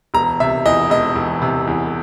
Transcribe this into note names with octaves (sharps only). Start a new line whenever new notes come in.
E1 A#5
C3 E5
E2 D#5
E1 D#5
E1
C3
E2